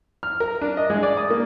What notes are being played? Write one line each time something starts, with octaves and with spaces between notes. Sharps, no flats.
F6
A#4
D4
D#5
G#3
D5
D#6
A#3